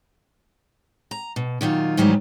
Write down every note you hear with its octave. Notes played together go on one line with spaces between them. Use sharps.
A#5
B2
A#2 D#3 F#3 F4
G#2 D#3 E3 F#3 G3